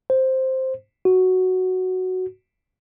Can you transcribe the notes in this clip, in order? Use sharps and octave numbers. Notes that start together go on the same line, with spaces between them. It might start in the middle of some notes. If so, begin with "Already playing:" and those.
C5
F#4